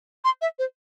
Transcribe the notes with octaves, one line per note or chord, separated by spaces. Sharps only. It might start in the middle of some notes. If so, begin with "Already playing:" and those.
C6
E5
C5